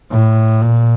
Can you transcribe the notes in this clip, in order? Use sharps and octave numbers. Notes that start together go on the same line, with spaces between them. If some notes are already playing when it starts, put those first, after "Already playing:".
A2
A#2